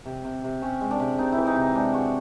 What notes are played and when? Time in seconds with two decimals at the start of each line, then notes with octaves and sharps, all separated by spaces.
0.06 C3
0.24 C3
0.44 C3
0.62 C3 C#4
0.81 G#3
0.91 D4
1.00 C3
1.18 C3 D#4
1.32 E3 E4
1.47 D#4
1.56 C3
1.61 D#4
1.75 G#3 D4
1.94 G#3 F#4